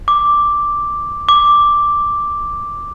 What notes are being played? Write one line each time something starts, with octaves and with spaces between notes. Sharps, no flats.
D6
D6